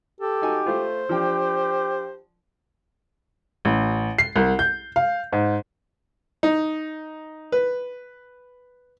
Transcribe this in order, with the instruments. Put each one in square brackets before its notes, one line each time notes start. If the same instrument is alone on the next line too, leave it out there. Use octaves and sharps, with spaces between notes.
[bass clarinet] G4 [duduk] A4
[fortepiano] D#4 F#4 G#5
[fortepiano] A3 F4 [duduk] C5
[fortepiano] F3 D4 G5 [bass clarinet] G4
[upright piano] A1
C7
C2
G6
F5
G#2
[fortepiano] D#4
B4